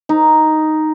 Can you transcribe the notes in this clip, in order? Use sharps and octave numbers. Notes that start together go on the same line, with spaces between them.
D#4